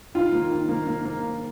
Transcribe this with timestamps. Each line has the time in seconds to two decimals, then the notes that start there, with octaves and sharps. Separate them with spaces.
0.14 D#3 F4
0.32 A#3
0.51 D#3
0.69 A#3
0.87 A#3
1.05 A#3